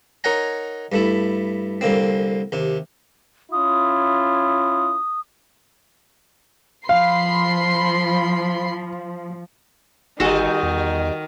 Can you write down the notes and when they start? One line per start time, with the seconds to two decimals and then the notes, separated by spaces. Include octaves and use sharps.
0.24 D#4 A#4 C#5 F#5 G#5 A#5
0.92 G2 A3 E4
1.81 C2 D3 A#3 C4
2.52 D#2 C3
3.52 C#4 E4 F4 D#6
6.89 F3 F5 B5 C6 C7
10.20 G1 D#3 G3 D#4 F#4 A4
10.63 E2